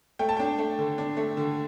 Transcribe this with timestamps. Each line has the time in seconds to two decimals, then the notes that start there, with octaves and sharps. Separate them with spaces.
0.19 A3 G5
0.29 A5
0.37 D4 G5
0.58 A3
0.79 D3
0.98 D4
1.17 A3
1.37 D3